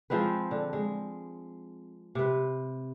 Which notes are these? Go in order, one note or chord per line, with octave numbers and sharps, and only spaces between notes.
F3 G#3 C4 B4
D3
G#3
C3 B4